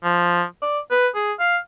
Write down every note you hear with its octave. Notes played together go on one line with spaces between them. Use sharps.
F3
D5
B4
G#4
F5